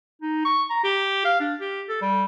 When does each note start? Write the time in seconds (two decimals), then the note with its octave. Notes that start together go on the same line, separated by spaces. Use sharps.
0.22 D#4
0.45 C#6
0.70 A#5
0.84 G4
1.25 F5
1.40 D4
1.60 G4
1.89 A4
2.02 G3